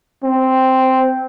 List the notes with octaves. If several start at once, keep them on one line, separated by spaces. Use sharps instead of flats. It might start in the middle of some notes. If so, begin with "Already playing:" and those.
C4